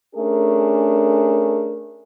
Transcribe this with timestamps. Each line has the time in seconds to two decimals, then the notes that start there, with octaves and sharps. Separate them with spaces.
0.16 A3 C#4 D4 G#4 A#4